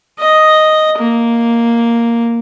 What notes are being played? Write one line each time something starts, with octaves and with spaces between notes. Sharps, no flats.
D#5
A#3